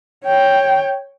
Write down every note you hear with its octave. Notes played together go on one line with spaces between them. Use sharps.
C#5 G5